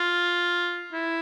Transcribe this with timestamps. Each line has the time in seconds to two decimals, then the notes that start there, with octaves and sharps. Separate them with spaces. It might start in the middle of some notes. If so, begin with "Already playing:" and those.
Already playing: F4
0.93 E4